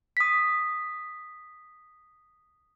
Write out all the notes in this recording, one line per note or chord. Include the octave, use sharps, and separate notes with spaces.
D#6 B6